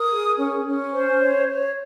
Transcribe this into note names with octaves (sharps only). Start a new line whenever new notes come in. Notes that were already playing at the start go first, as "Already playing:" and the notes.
Already playing: A#4 D#6
G#4
C#4
C#4
C5
C#5
C#5